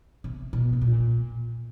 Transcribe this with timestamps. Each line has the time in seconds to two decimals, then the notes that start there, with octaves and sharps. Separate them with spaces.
0.24 C3
0.53 B2
0.73 A2
0.81 A#2